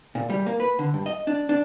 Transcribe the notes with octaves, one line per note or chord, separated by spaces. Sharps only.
A#2
G3
A#3
B4
D3
G2
D#5
D4
D4